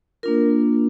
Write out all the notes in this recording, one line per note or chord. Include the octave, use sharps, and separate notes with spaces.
A#3 D4 F4 A#4